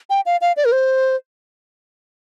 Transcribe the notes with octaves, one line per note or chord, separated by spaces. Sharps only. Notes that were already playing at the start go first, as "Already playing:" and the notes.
G5
F5
F5
D5
A#4
C5